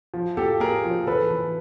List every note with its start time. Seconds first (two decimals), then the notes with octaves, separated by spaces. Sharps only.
0.14 F3
0.37 A#3 G4 A4
0.60 A#3 G#4 A#4
0.84 F3
1.07 E3 A4 B4
1.30 E3